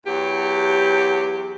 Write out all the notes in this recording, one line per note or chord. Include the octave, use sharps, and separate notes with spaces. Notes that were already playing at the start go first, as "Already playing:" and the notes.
E2 F#3 G4